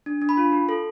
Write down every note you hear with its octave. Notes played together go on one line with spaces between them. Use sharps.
D4
D4
B5
F4
F#4
A4